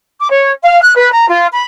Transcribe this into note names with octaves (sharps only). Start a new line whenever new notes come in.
D6
C#5
F5
F#6
B4
A#5
F4
B5